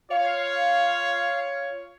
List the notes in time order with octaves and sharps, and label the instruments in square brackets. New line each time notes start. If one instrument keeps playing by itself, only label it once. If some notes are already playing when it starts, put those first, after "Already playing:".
[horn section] F4 C#5 [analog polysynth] F5